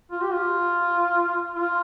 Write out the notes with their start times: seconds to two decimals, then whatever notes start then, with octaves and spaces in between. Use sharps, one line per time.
0.11 F4
0.22 G4
0.32 F4
1.55 F4